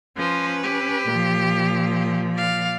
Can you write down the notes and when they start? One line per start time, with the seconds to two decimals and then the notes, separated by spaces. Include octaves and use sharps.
0.17 F3 C#4 B4 C5
0.63 G4
1.07 A#2 F3
2.33 D5 F5